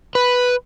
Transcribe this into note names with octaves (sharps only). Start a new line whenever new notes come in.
B4